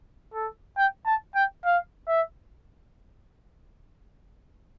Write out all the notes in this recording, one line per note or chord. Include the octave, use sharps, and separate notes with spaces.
A4
G5
A5
G5
F5
E5